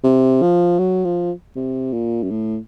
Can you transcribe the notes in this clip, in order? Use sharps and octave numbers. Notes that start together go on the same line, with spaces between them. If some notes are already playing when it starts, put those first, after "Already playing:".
C3
F3
F#3
F3
C3
A#2
F#2
A2